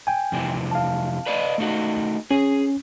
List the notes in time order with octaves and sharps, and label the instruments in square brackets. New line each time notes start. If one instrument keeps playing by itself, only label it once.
[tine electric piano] G5 G#5
[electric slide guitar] F2 C3 E3
[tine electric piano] F5 A5
[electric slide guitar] B4 D5 D#5
A3 D#4 F#4
[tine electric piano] C#4 [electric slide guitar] G#4